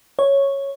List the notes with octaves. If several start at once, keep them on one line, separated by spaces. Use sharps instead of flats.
C#5